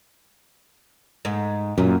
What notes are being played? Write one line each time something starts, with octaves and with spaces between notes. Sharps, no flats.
G#2
F#2 A#2